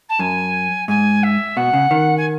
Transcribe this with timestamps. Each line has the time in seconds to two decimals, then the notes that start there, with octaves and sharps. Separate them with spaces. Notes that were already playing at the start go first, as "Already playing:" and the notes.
0.09 A5
0.19 F#2 G#5
0.88 G#2 G#5
1.23 E5
1.56 B2 F#5
1.73 C#3
1.91 D#3
2.17 G#5